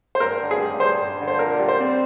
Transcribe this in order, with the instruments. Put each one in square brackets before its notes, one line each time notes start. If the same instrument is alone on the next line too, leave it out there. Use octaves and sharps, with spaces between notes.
[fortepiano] C5
[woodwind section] G2 [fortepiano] A#4
[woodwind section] D3
[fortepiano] G#4
[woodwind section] G3
[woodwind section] G2 [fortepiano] C5
[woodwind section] G2
D3
[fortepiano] C5
[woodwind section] A#2 [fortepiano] A#4
[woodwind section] G3
[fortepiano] C5
[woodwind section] C4